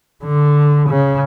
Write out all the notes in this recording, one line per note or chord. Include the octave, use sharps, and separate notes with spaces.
D3
C#3